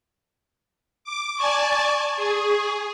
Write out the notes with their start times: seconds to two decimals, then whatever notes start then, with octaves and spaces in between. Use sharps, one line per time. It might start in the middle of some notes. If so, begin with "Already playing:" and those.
1.04 D6
1.38 D5 G#5 A5 C#6
2.17 G#4